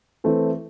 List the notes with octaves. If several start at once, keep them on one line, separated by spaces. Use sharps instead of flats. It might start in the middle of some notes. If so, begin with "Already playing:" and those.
E3 A3 C4